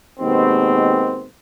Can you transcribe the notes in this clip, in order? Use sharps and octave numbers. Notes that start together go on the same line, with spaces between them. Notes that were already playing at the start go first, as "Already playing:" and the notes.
D#2 B2 D#3 G#3 C4